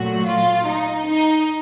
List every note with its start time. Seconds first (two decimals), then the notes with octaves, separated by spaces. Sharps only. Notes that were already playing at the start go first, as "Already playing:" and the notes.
Already playing: A#2 F#3 A3 F#4
0.26 F4
0.67 D#4
1.06 D#4